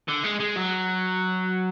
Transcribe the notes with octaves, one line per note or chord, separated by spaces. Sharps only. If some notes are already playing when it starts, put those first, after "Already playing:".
D3
G#3
G#3
F#3